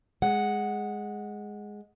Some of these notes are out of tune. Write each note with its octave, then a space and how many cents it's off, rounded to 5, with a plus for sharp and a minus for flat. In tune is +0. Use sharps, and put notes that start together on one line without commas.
G#3 +0 F#5 +0